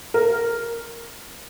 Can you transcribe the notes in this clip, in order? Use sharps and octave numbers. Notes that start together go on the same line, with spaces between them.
A#4